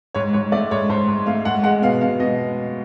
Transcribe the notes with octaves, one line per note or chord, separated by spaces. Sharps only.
G#2 C#5
G#2 C#5
A3 D5
G#2 C#5
G#2 C5
G#2
A3 F5
G#2 F#5
G#3 F#5
B2 F5
B2 F5
B2 D#5